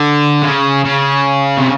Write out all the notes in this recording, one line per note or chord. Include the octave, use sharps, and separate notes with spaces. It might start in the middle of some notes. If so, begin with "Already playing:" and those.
Already playing: D3
C#3
C#3
C3